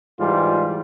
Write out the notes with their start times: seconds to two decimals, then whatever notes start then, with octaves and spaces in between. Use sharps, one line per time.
0.19 G#2 E3 G3 F4